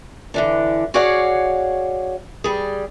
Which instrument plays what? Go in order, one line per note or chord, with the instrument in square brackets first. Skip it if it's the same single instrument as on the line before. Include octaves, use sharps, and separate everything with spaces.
[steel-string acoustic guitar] D3 E3 D4
F#4 G#4 C#5 D5 F5 F#5
G3 G#4